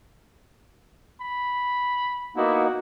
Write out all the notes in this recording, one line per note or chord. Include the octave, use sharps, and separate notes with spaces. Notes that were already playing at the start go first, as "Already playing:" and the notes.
B5
A#3 B3 D#4 E4 F#4